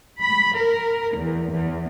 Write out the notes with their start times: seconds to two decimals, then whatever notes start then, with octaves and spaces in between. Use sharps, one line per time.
0.20 B5
0.55 A#4
1.13 E2
1.51 E2